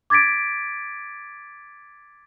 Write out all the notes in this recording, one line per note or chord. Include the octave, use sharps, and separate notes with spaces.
D6 G#6 A6 B6 D7